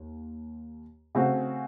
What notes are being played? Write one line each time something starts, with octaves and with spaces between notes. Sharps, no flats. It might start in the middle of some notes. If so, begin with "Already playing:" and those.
Already playing: D#2
C#3 A3 C4 F#4